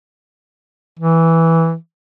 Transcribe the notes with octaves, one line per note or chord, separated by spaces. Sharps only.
E3